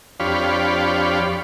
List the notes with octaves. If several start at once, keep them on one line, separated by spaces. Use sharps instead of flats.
F2 D4 G4 C#5 F5 B5